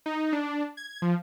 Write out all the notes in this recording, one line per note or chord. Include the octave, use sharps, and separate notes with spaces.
D#4
D4
G#6
F3